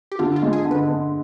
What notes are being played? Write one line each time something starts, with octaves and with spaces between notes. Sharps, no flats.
G4
D3 F4
F4
G#3
G#4
D3
B4
D3